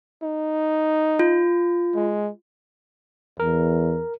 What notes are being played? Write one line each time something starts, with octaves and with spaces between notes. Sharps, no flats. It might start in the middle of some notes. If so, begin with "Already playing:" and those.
D#4
F4
G#3
E2 A#4